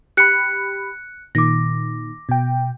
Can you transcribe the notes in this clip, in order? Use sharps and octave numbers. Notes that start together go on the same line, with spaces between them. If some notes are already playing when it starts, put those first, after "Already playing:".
G4 B5 F#6 C#7
A#2 D#3 D6 A#6
B2 G5